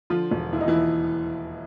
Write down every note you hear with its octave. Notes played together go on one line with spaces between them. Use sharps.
D3 F3 F4
E1
D#2 E4
D#4
E3 E4